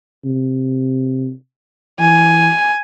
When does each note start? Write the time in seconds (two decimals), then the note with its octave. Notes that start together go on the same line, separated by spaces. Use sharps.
0.25 C3
2.00 E3 G#5